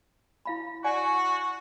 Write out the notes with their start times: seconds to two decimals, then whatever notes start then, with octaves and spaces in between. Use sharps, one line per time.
0.45 E4 F5 B5
0.84 F#4 D5 F#5 G#5